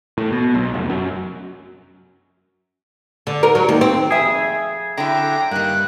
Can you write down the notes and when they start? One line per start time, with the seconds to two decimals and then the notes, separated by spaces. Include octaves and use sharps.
0.18 A2
0.32 B2
0.55 B1
0.74 F1
0.90 F#2
3.27 D3
3.43 A#4
3.55 F#3
3.69 D#2
3.81 C4
4.11 F2 G#4 E5
4.97 D3 F#3 E4 G5 A#5 D6
5.51 G2 D#3 A#3 F#6